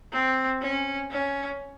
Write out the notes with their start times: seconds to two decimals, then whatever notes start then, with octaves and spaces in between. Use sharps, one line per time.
0.13 C4
0.62 C#4
1.11 C#4